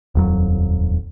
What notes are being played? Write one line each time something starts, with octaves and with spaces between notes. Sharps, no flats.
D#1 F2 F#3